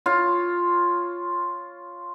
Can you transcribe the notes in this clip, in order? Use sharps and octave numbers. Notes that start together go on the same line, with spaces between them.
F4 C#5